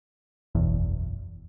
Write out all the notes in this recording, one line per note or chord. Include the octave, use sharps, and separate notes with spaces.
F#1 B1 E2